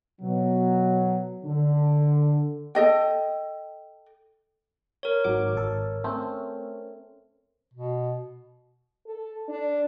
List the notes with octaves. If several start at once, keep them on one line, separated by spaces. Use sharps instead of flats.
B2 F#3
D3
A4 D#5 G5
A#4 C#5
G#1 F#3 D6
G#1 A4
A3 C4 C#4
B2
A4
D4